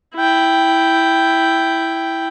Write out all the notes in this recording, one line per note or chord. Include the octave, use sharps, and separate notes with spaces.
E4 G5